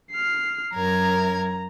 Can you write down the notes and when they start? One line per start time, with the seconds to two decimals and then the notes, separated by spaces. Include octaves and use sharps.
0.11 F6 C7
0.74 F#2 A#4 A#5 G#6